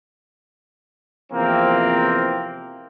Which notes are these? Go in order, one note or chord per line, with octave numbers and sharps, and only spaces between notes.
E2 C3 F3 A#3 C4